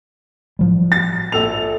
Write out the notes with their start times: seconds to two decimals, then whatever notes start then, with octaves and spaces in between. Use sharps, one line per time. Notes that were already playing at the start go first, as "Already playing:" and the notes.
0.59 A2 F3 G3
0.92 A6
1.32 A#1 A4 F7